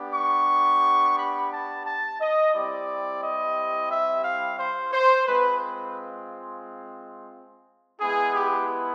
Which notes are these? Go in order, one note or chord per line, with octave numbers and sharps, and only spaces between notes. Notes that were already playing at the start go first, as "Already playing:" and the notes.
Already playing: B3 D4 G4
C#6
B5
A5
A5
D#5
G3 C4 E4 G4 D5
D#5
E5
F5
C5
C5
G#3 C4 F4 B4
B4
G#3 B3 E4 G#4
G4